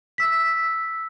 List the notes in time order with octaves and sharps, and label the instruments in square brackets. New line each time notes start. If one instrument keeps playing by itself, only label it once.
[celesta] E6 B6